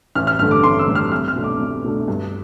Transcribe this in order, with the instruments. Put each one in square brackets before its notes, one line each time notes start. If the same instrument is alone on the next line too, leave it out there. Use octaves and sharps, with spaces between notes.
[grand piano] A1 F6
F6
G2 D3 A3 F6
D6
A1 C6
E6
G2 D3 A3
F6
C2 F6
F6
B2 A3 D4
D6
C2
B2 A3 D4
G2